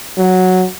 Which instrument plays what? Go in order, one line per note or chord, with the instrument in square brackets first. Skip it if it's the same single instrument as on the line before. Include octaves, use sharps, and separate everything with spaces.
[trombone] F#3